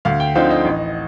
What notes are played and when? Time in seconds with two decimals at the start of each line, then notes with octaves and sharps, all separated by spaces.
0.05 D2 F5
0.20 G5
0.35 D3 F3 C4 D#4 F5
0.51 D#5
0.65 A1